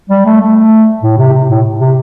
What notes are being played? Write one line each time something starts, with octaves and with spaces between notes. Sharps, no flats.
G3
A3
A3
A2
C3
C3
A2
C3